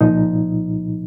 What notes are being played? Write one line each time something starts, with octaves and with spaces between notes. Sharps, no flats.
C2 A#2 F3 D#4